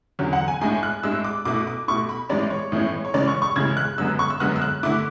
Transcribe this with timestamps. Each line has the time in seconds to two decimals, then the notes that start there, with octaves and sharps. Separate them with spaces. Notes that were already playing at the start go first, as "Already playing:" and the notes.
0.19 E2 D3 F#3 C#4
0.33 F#5
0.48 G#5
0.61 A2 G#3 D4 G#5
0.83 F#6
1.03 A2 G#3 D4 E6
1.24 D6
1.45 B2 A3 E4 D6
1.67 D6
1.88 B2 A3 E4 C#6
2.09 B5
2.29 A2 E3 G#3 C#4 D5
2.50 C#5
2.72 A2 E3 G#3 C#4
3.05 C#5
3.14 C#3 E3 G#3 C#4 D5
3.28 C#6
3.42 C#6
3.56 C#3 E3 G#3 C#4 G#6
3.77 F#6
3.98 F#2 D3 G#3 B3 E6
4.19 C#6
4.30 E6
4.40 F#2 D3 G#3 B3 F#6
4.56 E6
4.62 F#6
4.83 D3 A3 E4 D6